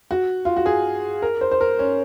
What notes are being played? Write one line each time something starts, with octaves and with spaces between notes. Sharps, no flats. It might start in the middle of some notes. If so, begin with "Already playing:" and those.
F#4
F4
F#4
G#4
A#4
C5
C5
A#4
C#4